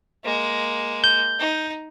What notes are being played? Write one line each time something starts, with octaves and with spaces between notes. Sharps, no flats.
G#3 A#3
G6
D#4